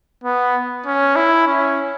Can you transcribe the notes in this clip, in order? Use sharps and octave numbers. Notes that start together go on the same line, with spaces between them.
B3
C#4
E4
C#4